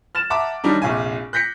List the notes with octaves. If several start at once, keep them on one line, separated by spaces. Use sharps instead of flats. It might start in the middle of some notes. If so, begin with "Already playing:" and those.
F6 A6 E7
E5 F#5 A5 A#5 D6
D#3 F#3 G3 D4 D#4
F1 A#1 F4 G#5
F#6 G6 A#6 B6 C#7